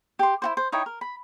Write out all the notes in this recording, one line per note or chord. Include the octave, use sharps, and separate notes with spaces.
G4 C6
E4 F#4 C5
C5
D#4 E4 C#5 G5
A#4
B5